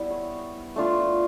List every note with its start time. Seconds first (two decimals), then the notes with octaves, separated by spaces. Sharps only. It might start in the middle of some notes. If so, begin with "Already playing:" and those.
Already playing: G3 B3 E4
0.11 C#5
0.76 A3 D4 F4